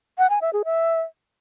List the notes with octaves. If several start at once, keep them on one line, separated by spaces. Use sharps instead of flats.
F#5
G#5
E5
G#4
E5